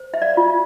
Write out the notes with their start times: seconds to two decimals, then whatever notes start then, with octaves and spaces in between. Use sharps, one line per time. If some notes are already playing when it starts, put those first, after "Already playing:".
Already playing: C5
0.14 E5
0.22 D5 F5
0.37 F4